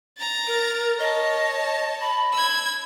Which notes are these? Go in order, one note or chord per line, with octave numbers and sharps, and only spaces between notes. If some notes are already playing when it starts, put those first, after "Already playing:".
A#5 A6
A#4
C#5 D#5 A5
B5
E6 G#6